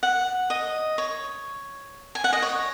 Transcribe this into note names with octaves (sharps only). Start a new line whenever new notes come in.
F#5
D#5
C#5
G#5
F#5
D#5
C#5